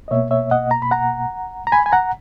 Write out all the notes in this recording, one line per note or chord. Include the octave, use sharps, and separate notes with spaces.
D#5
B2 A#3 C#5 E5
C#5 E5
D#5 F#5
A#5
B5
F#5 A#5
A#5
G#5 B5
G#5
F#5 A#5